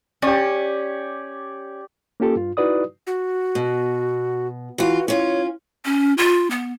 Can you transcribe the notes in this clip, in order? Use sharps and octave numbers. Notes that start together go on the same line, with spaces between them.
C#4 G4 D5
A#3 C#4 F4 G4 A4
G2 F4
D#4 E4 F#4 B4 D5 D#6
F#4
B2
E3 F4 F#4
C#4 F4 C#5
C#4
F4
B3